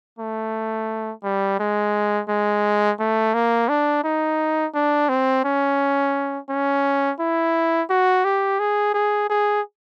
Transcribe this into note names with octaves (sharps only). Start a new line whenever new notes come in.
A3
G3
G#3
G#3
A3
A#3
D4
D#4
D4
C4
C#4
C#4
E4
F#4
G4
G#4
G#4
G#4